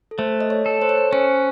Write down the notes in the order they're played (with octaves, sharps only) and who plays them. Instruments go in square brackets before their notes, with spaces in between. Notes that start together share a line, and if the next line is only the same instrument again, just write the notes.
[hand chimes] A4
[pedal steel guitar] A3 [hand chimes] C5
[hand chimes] D#5
C#5
[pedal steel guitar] A4
[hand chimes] C5
C#5
C5
[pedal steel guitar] C#4 [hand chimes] C5